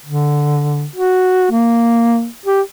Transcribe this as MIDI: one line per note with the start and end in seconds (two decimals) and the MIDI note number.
0.06 0.85 50
0.96 1.49 66
1.51 2.27 58
2.46 2.61 67